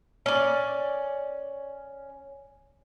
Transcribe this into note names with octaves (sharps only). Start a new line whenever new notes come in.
C#4 D5